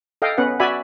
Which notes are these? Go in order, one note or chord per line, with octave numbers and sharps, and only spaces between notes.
A4 D#5 F5 G5
B3 C#4 B4 F#5
F#4 D5 E5 G#5 B5